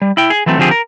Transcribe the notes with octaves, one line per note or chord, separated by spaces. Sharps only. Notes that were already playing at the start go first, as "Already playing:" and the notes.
G3
E4 G5
G#4
E3 F#3 A3 C4
D3 F3 C4 G4 G#4
A#4